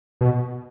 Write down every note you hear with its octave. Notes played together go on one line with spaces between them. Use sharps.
B2